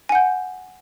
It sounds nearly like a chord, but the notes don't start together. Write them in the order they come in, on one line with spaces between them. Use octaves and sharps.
G#5 F#5 G6